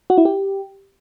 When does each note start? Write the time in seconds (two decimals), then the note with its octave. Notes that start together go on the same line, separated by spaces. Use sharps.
0.10 F#4
0.18 E4
0.25 G4